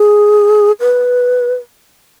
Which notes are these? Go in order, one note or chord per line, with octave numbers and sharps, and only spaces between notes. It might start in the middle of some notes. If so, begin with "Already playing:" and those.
Already playing: G#4
B4